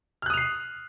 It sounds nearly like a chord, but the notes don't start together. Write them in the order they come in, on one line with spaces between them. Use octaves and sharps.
F6 F#6 D#6 F7 C7